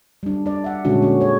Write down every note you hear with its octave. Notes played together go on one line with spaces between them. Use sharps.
G3 D4
D4 D5
E5 F#5
A#2 D3 G#3 C#4 D4 F#4
C#4 F#4
G#4 C#5